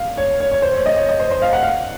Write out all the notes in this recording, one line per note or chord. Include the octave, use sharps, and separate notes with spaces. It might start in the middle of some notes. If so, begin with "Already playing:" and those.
Already playing: F5
C#5
C#5
C#5
C5
C#5
D#5
C#5
D#5
C5
C5
F5
F#5
F5